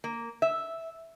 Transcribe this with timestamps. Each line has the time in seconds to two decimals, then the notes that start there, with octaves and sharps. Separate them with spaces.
0.04 A#3
0.42 E5